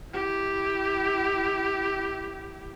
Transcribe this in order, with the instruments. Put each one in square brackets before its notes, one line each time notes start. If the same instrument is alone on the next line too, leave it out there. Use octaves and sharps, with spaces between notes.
[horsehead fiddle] E4 G4